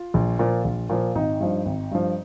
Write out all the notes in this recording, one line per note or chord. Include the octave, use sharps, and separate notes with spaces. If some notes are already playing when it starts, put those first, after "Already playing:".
Already playing: F4
A#1
A#2 F3
A#1
A#2 F3
G#1 D#4
G2 F3
G#1
G2 F3